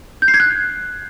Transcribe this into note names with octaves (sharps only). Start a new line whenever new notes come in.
G6
C7
G#6
F#6